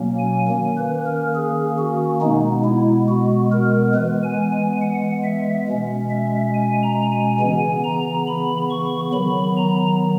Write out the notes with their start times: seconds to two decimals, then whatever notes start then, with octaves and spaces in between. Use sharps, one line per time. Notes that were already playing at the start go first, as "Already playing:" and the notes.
Already playing: B2 F#3 A#3 C#4
0.19 G#5
0.48 D#3 A#3 C#4
0.77 B4
1.06 A#4
1.36 G#4
1.78 F#4
2.21 B2 G#3 B3 D#4
2.65 E4
3.08 F#4
3.52 A#4
3.95 E3 G#3 B3 B4
4.24 G#5
4.52 G#5
4.81 F#5
5.24 E5
5.68 B2 G#3 C#4
6.10 E5
6.54 G#5
6.83 A#5
7.12 G#5
7.40 C#3 E3 B3 G#5
7.84 A#5
8.28 B5
8.71 C#6
9.13 D#3 F#3 B3 B5
9.57 A#5